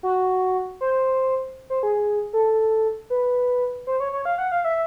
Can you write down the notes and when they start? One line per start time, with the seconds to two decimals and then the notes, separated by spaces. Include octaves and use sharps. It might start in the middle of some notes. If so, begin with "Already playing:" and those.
0.03 F#4
0.81 C5
1.70 C5
1.83 G#4
2.33 A4
3.10 B4
3.87 C5
4.00 C#5
4.12 C#5
4.25 F5
4.38 F#5
4.52 F5
4.64 E5